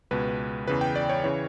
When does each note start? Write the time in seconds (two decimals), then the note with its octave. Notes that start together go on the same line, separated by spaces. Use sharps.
0.11 C#2 B2 B4
0.67 E2 C#3 E3 B4
0.81 G5
0.96 D5
1.10 C#5
1.24 C#3 E3 C#5